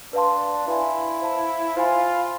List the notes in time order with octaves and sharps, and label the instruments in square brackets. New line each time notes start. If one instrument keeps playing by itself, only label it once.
[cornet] D4 [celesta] B4 D5 F5 A5 C6
[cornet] E4 [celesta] B4 F5 G#5 C6
[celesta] C5 F5 A5
[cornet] F4 [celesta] C5 G#5 B5